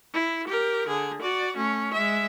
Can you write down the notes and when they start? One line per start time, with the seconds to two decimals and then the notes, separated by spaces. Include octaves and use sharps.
0.13 E4
0.47 G4 A#4
0.87 D3 G#4
1.21 F#4 D5
1.57 A3 C#4
1.93 G#3 E5